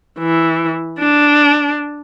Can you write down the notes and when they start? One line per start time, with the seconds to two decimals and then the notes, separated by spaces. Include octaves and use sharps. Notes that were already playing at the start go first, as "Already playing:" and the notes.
0.19 E3
0.99 D4